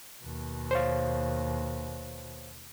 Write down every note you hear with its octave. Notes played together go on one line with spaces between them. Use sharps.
D#2 B2
C5 C#5 F5